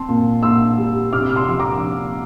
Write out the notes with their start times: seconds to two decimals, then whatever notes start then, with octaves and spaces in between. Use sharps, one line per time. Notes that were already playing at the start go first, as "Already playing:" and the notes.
Already playing: C4 A5 C6
0.09 A#2
0.43 A#2 C6 E6
0.78 G3
1.13 C3 D6 F6
1.29 F6
1.36 C6 E6
1.48 F3 C6
1.59 A#5 D6